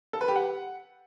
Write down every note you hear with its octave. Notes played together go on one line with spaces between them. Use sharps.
A4
B4
G4
F#5